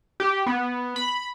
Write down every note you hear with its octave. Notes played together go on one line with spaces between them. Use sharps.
G4
B3
B5